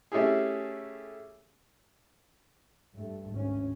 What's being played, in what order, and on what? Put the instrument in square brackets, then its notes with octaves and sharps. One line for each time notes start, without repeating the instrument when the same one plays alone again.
[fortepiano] A3 C#4 E4 G4 G#4
[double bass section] G2 A3
G#1 D2 C#4